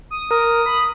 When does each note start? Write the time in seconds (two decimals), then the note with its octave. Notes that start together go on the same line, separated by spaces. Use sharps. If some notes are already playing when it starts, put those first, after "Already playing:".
0.11 D#6
0.31 A#4 D#6
0.66 B5